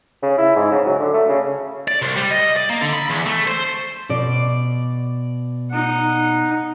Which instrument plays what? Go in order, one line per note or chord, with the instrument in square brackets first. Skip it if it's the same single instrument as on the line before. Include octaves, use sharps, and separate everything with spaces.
[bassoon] C#3
E4
G#2
C#3
F#3
D3
A3
C#3
[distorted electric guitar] D5
C2
G3
D#5
D5
A#3
D3
B5
E2
A3
C5
[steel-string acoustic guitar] B2 D5
[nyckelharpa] D#4 F#5